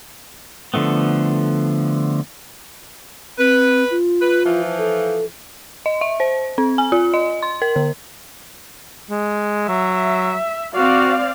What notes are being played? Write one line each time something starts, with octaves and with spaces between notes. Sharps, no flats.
D3 F3 A3 B3
C4 B4
F4
B4
E3 F3
A4
D#5
E5
C5
C4
G#5
F4
D#5
C6
A#4
D3
G#3
F#3 E5
C4 F#4 D5 F5